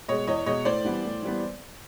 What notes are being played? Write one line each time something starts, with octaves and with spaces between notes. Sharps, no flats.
B2 G#3 C#5 D#5
E2 C#5 D#5
B2 G#3 C#5 D#5
A2 C5 D5
E3 G3 B3
A2
E3 G3 B3